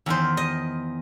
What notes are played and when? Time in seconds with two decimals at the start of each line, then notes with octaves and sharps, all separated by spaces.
0.06 E2 D#3 C5
0.37 D#5